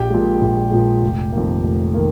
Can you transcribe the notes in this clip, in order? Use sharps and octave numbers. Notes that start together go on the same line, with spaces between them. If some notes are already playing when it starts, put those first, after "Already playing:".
Already playing: A#1 G4 G5
A#2 F3 G#3
A#1
A#2 F3 G#3
F1
F2 D#3 A#3
F1
D#3 A#3